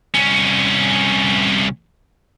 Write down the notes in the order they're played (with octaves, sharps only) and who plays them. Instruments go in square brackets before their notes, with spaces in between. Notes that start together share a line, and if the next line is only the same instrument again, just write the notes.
[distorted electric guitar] C2 C#4